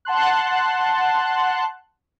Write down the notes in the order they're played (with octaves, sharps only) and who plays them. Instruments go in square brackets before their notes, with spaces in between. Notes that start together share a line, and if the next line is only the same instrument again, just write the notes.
[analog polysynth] F#5 A5 C6 F#6